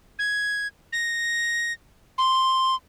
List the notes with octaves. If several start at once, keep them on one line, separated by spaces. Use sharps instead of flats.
G#6
A#6
C6